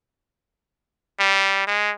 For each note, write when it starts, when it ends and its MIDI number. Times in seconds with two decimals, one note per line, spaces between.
1.20 1.62 55
1.67 1.92 56